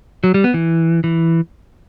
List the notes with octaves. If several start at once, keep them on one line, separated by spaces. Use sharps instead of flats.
F#3
G3
B3
E3
E3